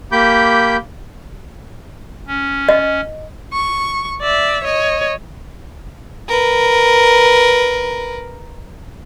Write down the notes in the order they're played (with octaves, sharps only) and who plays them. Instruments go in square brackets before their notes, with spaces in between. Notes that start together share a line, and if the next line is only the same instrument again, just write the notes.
[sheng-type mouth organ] A#3 G4 B5 D6 G6
[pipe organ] C#4
[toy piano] D#5
[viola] C#6
D5 E5
C#5 D#5
[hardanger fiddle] A#4 B4